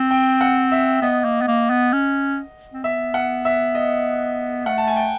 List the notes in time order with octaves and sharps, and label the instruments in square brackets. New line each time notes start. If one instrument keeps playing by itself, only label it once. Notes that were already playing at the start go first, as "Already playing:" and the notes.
Already playing: [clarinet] C4
[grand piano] G5
F#5
E5
[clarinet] B3 [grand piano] D#5
[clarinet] A#3
B3
A#3
B3
C#4
C4
[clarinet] B3 [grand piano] E5
[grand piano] F#5
E5
D#5
[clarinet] A3 [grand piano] F#5
[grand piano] A5
G#5
G5